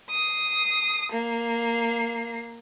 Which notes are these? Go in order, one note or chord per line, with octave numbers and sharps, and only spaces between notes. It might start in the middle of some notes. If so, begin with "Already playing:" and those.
D#6 C7
A#3 C7